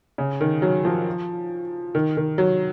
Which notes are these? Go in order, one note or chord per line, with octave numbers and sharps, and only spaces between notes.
C#3
D#3
F#3
F3
D#3
D#3
F#3